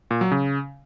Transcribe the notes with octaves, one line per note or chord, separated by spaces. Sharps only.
A#2
F#3
C#3